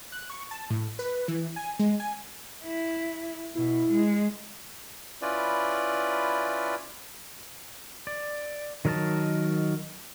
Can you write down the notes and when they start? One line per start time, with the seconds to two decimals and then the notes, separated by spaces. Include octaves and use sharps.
0.12 F#6
0.30 C#6
0.51 A5
0.70 A2
0.99 B4
1.28 E3
1.56 G#5
1.79 G#3
2.00 G#5
2.64 E4
3.55 B2 E4
3.91 G#3
5.22 C#4 E4 F4 B4 D5
8.07 D5
8.85 D#3 F#3 A#4 D#5 A5